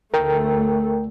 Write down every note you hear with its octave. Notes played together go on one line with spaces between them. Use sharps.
D2 A3 A#4 G5